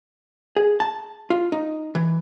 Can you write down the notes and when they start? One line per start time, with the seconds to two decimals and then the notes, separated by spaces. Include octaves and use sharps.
0.56 G#4
0.80 A5
1.30 F4
1.52 D#4
1.95 E3